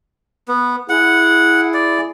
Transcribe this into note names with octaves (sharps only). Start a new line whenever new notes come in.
B3
E4 G#4 F#5
D5